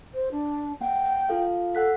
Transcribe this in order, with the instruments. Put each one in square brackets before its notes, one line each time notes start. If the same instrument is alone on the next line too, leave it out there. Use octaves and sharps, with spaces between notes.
[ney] C5
D4
[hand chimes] A#3 F#5 [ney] G5
[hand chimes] F4 A4 F5
[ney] A4 [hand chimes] F#5 F#6 B6